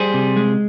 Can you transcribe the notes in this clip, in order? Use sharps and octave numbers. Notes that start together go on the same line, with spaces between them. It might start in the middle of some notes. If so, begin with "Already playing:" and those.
Already playing: G3 G#4 C5
C3
G#3